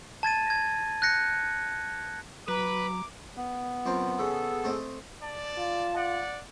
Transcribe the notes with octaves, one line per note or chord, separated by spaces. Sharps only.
A5 G#6 A6 D#7
G#6 A#6
F#6 G6 A#6 C#7
F#3 B4 A#5 D6
B3
F#2 C4 F4
C#3 G#4 A4
A3 C4 D#5
D5 A5
F4
D5 F#5